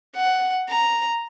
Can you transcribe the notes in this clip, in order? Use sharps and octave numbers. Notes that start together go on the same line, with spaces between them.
F#5
A#5